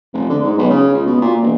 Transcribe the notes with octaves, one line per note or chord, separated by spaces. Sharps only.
F1
D3
G#2
B1
C#3
C#2
B2
A#2
E1